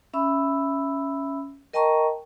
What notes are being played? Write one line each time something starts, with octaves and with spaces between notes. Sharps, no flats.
C#4 E5 B5 E6
A#4 D#5 G5 A5 A#5 C#6